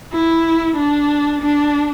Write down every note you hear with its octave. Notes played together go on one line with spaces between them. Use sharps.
E4
D4
D4